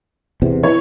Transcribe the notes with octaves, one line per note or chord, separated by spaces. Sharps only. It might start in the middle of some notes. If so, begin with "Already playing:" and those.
E2 C3
E3 C#5